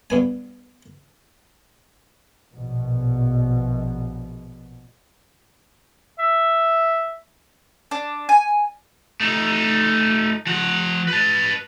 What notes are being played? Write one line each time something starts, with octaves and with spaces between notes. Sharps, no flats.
G2 B3 G#5
A#1 B2
E5
D4
G#5
A3 D#4
F3 F#5
B4 A5